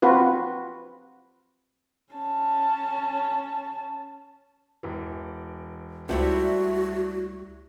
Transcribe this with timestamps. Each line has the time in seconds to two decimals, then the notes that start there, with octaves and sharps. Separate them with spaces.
0.02 C4 F4 F#4 B4
2.13 C#4 A5
4.83 E1 E3
6.09 C#2 G3 A3 E4 F#4 G4 C5 C#5